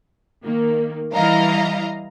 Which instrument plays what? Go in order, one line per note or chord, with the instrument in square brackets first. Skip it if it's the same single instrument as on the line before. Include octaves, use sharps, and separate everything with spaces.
[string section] D#3 A#3
[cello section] E3 G3 E4 [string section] D#5 F5 A#5